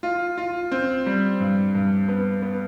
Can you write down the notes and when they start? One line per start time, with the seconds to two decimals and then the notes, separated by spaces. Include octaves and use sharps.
0.03 F4
0.38 F4
0.72 C4
1.06 G3
1.40 G2
1.75 G2
2.08 B3
2.42 B3